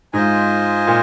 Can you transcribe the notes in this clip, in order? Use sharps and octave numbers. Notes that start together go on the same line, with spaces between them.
G#2 F4 C5 D#5 G#5
A#2